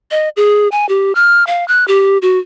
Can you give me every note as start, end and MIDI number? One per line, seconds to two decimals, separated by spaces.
0.11 0.29 75
0.37 0.68 68
0.72 0.88 80
0.89 1.13 67
1.15 1.46 89
1.47 1.66 77
1.68 1.87 90
1.88 2.18 67
2.22 2.39 66